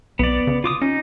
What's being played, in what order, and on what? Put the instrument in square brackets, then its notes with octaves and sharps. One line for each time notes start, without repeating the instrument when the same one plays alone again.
[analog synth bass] B1 [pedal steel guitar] B3 D5
[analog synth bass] C#3
[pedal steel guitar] F4 D6 D#6
[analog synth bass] C#4 [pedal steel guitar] D#4